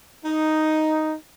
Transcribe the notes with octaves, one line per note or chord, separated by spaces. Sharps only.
D#4